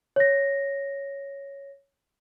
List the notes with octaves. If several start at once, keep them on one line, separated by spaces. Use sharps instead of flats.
C#5 A#6